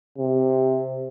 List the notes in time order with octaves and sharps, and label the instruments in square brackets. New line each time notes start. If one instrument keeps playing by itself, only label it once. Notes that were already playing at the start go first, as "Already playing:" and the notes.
[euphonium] C3